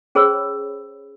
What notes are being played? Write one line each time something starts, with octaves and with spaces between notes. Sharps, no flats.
C#4 G#4 C5 C#5 B5 E6